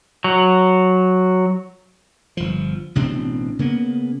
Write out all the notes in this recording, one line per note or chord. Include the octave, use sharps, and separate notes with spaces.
F#3
G1 F3
A1 B2 C4 D4
C#3 A#3 B3